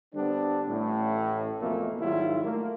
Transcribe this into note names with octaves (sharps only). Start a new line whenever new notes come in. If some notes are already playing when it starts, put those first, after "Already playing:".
D3 G3 B3 C4 D4
A1 A2
F2 B2 E3 A3 A#3
G#2 D#3 F#3 G3 E4 F4
A3 A#3